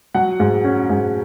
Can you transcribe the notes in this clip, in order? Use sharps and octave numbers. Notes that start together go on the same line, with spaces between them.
F#3 F#5
G#2
C#4
G#2